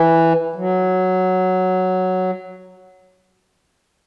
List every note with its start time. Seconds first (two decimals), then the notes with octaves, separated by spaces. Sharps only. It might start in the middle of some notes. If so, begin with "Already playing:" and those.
Already playing: E3
0.56 F#3